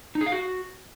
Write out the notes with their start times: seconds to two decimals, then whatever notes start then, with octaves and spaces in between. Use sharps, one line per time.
0.15 D#4
0.21 G#4
0.26 F5
0.32 F#4